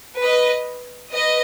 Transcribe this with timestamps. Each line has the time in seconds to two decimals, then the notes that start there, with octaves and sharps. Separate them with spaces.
0.20 B4 D#5
1.13 B4 D#5